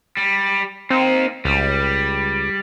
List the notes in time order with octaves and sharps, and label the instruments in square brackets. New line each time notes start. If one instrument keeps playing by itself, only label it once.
[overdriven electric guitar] G3
[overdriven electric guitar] A#3 D#4 [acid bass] C4
[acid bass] C#2 [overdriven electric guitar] G3